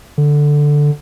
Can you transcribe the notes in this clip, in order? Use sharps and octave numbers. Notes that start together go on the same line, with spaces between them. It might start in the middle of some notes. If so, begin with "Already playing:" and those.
D3